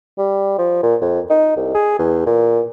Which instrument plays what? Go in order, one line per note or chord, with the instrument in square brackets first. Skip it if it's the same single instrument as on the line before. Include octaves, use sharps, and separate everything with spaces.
[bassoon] G3
F3
A#2
F2
D#4
C2
G#4
E2
A#2